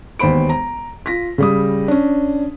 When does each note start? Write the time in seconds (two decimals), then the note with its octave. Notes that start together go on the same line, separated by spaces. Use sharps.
0.19 E1 D#2 B3 C5 B5 D7
0.49 A#5
1.06 F4 A#6 B6
1.38 C#3 G3 D#6
1.88 C#4 D4